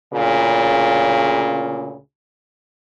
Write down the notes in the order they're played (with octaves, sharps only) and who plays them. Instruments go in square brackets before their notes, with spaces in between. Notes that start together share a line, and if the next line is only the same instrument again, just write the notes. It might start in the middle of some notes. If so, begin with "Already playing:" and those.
[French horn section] D2 A#2 C#3